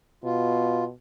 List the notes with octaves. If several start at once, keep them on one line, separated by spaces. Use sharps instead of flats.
B2 F4